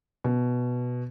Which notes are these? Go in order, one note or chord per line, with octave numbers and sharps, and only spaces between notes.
B2